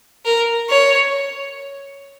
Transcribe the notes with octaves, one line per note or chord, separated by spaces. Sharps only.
A#4
C#5